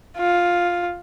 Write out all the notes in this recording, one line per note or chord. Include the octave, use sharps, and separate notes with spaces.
F4